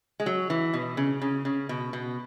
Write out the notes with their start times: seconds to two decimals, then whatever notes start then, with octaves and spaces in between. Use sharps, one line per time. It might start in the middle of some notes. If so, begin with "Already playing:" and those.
0.20 G#3
0.26 F#3
0.50 E3
0.73 B2
0.97 C#3
1.22 C#3
1.45 C#3
1.69 B2
1.93 B2